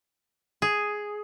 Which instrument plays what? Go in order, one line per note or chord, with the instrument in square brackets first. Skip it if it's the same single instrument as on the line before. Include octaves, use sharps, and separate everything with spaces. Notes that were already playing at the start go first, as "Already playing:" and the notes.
[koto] G#4